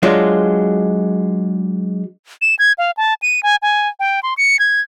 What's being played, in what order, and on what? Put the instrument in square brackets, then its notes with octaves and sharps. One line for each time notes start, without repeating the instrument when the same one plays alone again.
[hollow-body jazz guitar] F#3 G#3 D4 F4
[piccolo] E7
G#6
F5
A5
D#7
G#5
G#5
G5
C6
C#7
G#6